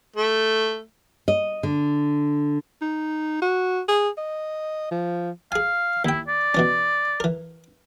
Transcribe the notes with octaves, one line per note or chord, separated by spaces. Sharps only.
A3
D#5
D3
D#4
F#4
G#4
D#5
F3
G#4 F5 G#5
D#2 E4 G5
D5
B2 E3 C#4
E3 A#4